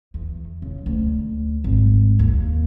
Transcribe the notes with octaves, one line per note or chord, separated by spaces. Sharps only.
E2
C#3
D2
G#1
D#2